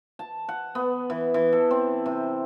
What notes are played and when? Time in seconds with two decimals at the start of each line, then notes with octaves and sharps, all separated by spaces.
0.19 A5
0.48 F#5
0.75 B3
1.10 E3
1.34 E3
1.53 A4
1.71 C4
2.06 C3